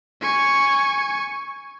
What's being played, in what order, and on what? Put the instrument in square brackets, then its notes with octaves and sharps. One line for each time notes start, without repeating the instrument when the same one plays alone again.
[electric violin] G#5 C#6